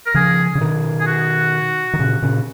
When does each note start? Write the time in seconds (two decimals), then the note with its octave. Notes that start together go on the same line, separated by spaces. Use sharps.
0.06 A#4
0.14 C#3 F3 G#4
0.55 C#3
0.61 B2 D#3
1.00 G#4
1.07 F#4
1.93 D#3
1.99 A#2 C#3
2.22 A#2 C#3